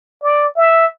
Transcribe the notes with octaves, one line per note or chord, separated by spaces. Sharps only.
D5
E5